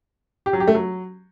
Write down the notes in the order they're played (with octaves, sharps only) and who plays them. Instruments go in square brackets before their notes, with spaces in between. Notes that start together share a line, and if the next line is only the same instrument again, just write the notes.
[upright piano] G4
F#3
G4
A3
F#3